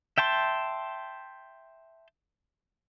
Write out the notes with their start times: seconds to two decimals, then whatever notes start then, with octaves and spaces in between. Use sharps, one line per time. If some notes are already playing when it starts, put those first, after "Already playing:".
0.18 E5 G5 A5 C6